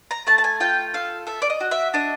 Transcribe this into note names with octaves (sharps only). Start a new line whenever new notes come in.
A#5
A3 A5
A5
G#5
F4 G5
A4 F5
A4 E5
D5
D#5
F#4
E5
D4 D#5